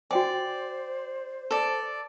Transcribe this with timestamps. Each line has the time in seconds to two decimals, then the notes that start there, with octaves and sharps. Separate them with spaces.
0.11 F#4 C5 D5 G5 G#5
1.51 A4 D5